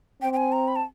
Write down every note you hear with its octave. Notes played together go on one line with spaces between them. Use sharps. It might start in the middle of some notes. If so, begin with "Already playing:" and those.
C4 G5
G5
G#5
A#5
B5
A5